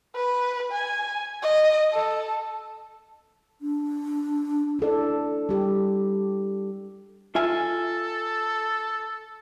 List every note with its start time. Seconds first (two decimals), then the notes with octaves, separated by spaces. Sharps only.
0.15 B4
0.72 G#5
1.43 D#5
1.93 A4
3.61 D4
4.79 D4 E4 A4 D5
5.49 G3 G4
7.35 F4 A4 E5 G#5